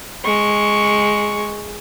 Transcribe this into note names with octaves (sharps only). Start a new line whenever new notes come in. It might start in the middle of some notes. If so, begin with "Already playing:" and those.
G#3 C#6